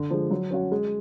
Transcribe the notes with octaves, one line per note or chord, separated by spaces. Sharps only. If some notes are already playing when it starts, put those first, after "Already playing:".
Already playing: D3
F3 G#3
F#3
C#4 F#4
G#3